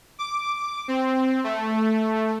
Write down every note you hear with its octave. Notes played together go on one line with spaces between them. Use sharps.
D6
C4
A3